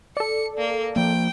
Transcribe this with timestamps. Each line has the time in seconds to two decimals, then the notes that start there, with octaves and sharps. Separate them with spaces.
0.17 A4 D5 C#7
0.58 A#3
0.96 F3 A#3 G5